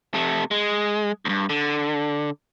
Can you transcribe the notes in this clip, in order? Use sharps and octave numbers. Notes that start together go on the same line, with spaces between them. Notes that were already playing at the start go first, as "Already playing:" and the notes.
C3 A3
G#3
D2 G2
D3